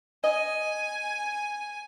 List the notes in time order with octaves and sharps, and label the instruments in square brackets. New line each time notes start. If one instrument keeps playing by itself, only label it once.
[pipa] D#5 [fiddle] G#5